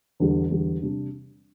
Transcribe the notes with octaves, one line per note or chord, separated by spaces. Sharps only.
E2 D3 G3
E2 D3 G3
C3 G3 D4